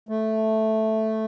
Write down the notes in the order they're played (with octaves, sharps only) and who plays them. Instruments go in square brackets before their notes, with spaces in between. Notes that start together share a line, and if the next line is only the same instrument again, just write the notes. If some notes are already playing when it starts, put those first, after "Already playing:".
[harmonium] A3